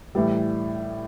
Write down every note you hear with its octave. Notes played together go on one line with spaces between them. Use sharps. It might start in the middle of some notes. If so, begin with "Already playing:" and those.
A2 E3 G3